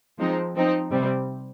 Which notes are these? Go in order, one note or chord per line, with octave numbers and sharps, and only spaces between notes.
F3 G#3 C4 D#4
F3 C4 D#4
C3 G3 C4